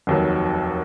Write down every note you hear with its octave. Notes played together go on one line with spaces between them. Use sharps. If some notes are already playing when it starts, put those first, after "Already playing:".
F1 D#2 D#3 F#3